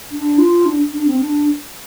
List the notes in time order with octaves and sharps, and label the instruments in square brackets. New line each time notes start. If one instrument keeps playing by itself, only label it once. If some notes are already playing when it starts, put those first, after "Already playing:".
[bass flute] D4
F4
D4
D4
C4
D4